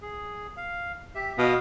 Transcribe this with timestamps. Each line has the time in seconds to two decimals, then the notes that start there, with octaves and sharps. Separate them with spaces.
0.02 G#4
0.57 F5
1.15 G4 E5
1.38 B2 D#5 F5 D#6